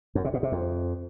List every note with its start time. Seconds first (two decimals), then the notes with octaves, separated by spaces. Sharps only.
0.15 F#2
0.25 C3
0.34 B2
0.43 C3
0.52 F2